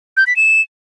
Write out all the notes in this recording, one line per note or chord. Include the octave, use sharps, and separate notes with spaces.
G6
B6
E7